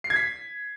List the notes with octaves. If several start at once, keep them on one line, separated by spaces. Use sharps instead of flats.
C7
G#6
B6